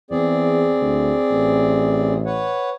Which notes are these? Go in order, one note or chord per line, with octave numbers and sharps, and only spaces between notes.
E2 C4 G#4 D5
D2
A1
B4 C#5 F#5